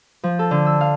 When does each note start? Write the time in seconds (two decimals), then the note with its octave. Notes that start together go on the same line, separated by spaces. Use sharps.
0.23 F3
0.39 A4
0.51 D3
0.66 E6
0.81 F5